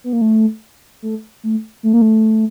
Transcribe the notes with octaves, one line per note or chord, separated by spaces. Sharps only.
B3
A#3
A3
A3
A3
A3
A#3
A3